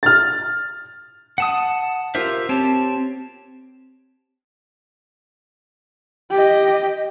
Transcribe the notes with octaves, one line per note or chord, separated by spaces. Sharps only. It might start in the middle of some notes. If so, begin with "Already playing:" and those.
F6 A6
F#5 A5 D#6
F4 G4 A#4 C5 E5
C4 G4 C#5 A5
G4 D#5